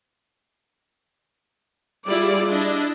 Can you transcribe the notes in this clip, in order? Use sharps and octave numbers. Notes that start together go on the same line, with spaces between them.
G3 E4 F4 G#4 D5
D4 E4 D#5